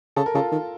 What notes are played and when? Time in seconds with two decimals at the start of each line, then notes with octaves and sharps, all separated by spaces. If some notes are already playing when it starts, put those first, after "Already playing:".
0.16 C#3 A4
0.26 A#4
0.34 C#3 F4 A4
0.52 D#3